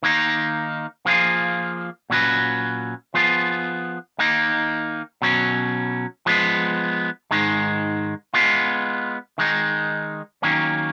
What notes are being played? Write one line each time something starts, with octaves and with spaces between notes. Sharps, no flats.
D#3 A#3 D#4
F3 A#3 F4 G#4
A#2 F#3 C#4 F#4 B4
F3 B3 F4 G#4
D#3 A#3 D#4
B2 F#3 C#4
F3 G#3 B3
G#2 D#3 G#3
G#3 B3 F4
D#3 G#3 D#4
D#3 F#3 A#3 C#4